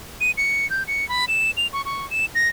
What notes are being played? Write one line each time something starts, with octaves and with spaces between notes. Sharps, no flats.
D#7
C#7
G6
C#7
B5
E7
F7
C#6
C#6
E7
A#6